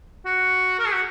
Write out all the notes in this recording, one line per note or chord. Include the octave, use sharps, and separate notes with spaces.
F#4
A#4
G#4
F#4